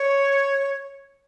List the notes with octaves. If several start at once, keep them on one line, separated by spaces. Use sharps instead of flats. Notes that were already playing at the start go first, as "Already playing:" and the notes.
Already playing: C#5